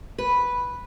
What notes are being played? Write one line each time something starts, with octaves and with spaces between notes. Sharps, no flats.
B4